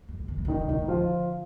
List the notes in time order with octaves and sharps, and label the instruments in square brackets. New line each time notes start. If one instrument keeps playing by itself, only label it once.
[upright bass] F#2
B2
D#3
E3
C#3
[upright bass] D3 [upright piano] D#3 D#4
[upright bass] B2
C3
[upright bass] A#2 [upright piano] D#3 D#4
[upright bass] A2
[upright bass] D3 [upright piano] F3 F4